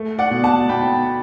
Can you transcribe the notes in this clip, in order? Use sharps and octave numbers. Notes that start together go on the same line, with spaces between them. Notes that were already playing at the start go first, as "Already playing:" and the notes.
Already playing: A3
D5 F#5
B2
F#5 A5
B2 G5 B5